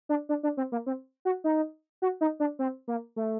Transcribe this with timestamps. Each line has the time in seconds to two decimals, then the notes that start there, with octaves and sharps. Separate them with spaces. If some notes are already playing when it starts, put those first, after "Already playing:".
0.09 D4
0.29 D4
0.43 D4
0.57 C4
0.72 A#3
0.86 C4
1.25 F#4
1.44 D#4
2.02 F#4
2.21 D#4
2.40 D4
2.59 C4
2.88 A#3
3.16 A3